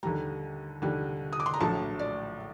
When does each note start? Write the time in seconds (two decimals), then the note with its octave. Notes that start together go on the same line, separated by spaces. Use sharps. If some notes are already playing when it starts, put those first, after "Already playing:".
0.03 D#2 D3 G3 A#5
0.82 D#2 D3 G3
1.33 D#6
1.40 D6
1.46 C6
1.54 A#5
1.60 A#1 A2 F#3 A5
1.99 D5